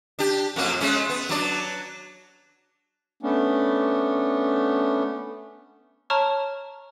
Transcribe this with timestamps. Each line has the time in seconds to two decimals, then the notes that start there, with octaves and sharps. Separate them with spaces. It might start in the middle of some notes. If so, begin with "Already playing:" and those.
0.19 D4 G4
0.56 F2 F#3 A#3
0.81 G#3 A3 C#4
1.09 B3
1.29 F#3 D4 D5
3.23 A3 B3 C#4 D4
6.10 C#5 A5 A#5 C#6 F6